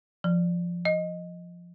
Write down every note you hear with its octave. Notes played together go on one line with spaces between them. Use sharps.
F3
D#5